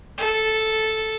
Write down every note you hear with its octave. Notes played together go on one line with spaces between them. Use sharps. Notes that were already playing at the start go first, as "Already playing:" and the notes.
A4